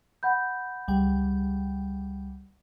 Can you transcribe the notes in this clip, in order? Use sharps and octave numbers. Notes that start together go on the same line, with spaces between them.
F#5 B5 G6
C#2 G3 G5